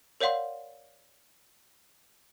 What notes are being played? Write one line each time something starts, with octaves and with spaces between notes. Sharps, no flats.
A#4 C#5 D5 F5 F#5 C6